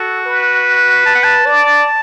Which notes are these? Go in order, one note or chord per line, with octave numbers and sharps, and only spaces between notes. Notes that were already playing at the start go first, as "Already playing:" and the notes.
Already playing: F#4 A4
B4
A5
F#5
A5
D5 A5